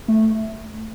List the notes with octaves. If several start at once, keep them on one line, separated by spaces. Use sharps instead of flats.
A3